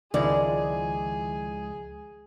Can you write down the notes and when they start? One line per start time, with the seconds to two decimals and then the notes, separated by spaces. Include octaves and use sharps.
0.14 C#2 D#3 F3 G#3 E4 G#4 D5